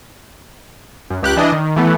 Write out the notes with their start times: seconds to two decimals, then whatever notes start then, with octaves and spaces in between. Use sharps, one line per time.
1.10 F#2
1.23 C#2 G4 F#6
1.37 E3 D4 D#5
1.52 D#3
1.76 E3 A3 B3